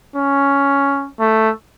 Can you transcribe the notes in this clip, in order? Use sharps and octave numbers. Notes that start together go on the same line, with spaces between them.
C#4
A3